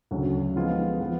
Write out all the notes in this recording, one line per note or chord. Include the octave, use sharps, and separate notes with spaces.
D2 C#3 F#3
F3 G#3 B3 F4 G#4
F3 B3